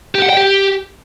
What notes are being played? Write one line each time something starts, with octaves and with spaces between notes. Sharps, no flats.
G4
F#5
G5
G4